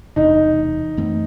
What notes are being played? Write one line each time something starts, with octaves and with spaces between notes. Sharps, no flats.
E1 E2 C3 D#4
F#2 E3 A3 C4